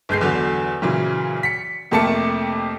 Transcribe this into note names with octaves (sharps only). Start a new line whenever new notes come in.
G1 G#3 G6 C7
E2 D3 F#3
A#2 C#3 E3 F#3
B6 C#7
F2 C3 A3 A#3 A5 C#7